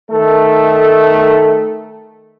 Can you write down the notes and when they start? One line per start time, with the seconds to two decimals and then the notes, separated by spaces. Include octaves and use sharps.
0.11 D#3 A3 A4